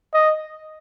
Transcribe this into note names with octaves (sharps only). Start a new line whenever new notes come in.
D#5